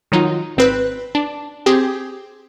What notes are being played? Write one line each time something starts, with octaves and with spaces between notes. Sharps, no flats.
D#3 F#3 D#4 F4
G#1 C4 B4
D4
C4 G4 G#4